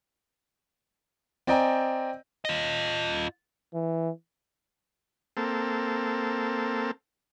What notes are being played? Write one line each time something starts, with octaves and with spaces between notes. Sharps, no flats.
C4 D5 D#5 G5 G#5 A#5
F4 D#5
E3
A#3 C4 A4